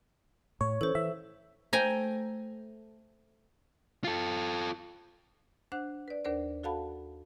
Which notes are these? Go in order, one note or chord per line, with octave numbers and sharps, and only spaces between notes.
A2 C#5
E3 C#4 A4 C5
E3 E5
A3 C5 G5 G#5 A#5
F4 A4
D4 C5 F#5 F#6
B4 D5
D#2 D4 A#4 C5 D5
F#4 A4 F5 F#5 A5 B5